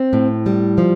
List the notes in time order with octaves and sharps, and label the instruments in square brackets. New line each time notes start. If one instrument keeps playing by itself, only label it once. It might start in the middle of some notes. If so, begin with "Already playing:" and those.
Already playing: [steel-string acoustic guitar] C4
A2
G3
F3